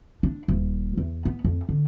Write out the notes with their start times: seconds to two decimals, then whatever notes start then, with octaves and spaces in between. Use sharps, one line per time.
0.23 D4
0.48 D#1
0.97 E2
1.25 B3
1.44 F2
1.69 D3